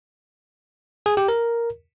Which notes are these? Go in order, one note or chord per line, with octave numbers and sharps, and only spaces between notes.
G#4
G4
A#4